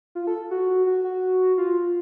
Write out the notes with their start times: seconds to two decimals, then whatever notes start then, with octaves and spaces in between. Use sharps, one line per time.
0.15 F4
0.27 A4
0.51 F#4
0.87 F#4
1.04 F#4
1.58 F4